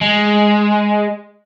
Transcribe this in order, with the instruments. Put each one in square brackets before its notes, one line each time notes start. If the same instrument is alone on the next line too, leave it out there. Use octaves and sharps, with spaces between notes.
[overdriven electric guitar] G#3